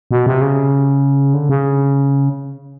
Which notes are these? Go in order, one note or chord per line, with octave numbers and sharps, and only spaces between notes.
B2
C3
C#3
D3
C#3